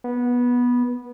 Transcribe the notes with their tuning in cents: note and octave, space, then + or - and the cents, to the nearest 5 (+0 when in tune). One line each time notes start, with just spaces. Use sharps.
B3 -15